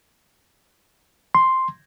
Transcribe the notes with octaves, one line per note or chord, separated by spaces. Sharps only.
C6